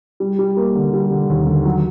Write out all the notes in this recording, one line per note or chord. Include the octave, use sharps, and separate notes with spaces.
G3
G3
A#3
D3
G3
D3
D#2
D3
F#3